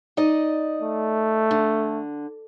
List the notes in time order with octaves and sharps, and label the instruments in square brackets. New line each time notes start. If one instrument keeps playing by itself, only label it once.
[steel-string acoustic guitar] D#4 D5 D#5
[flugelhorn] A3
[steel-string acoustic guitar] D3